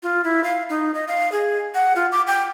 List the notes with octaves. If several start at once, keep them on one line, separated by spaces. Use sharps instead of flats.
F4
E4
F5
D#4
D#5
F5
G#4
F#5
F4
D6
G5